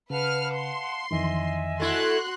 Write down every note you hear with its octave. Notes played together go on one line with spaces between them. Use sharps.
C#3 B4 F5 F#5 A5 F6
C6
F2 D#3 E3 D#5 E5 G#5
A3 E4 F#4 C6 F#6